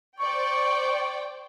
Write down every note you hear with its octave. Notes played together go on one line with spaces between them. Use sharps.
C5 D5 G5 C#6